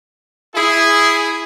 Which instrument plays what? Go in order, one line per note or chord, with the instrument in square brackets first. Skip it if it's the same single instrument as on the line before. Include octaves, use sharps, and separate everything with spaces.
[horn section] E4 G#4